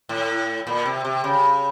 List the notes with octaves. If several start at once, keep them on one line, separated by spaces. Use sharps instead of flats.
A2
A#2
C3
C3
C#3